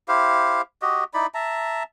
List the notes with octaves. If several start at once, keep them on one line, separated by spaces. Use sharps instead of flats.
E4 G4 C5 F5
F#4 G4 D#5
D#4 E4 D5 B5
E5 A5 A#5